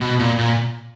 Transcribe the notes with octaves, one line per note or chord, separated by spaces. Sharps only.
B2
A#2
A#2